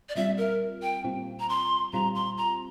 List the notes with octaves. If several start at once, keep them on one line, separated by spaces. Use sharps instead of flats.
D5
A#2 G3 C4 F4 E5
A#4
G5
A#2 G3 C4 F4
A#5
C6
A#2 G3 C4 F4 A#5
C6
A#5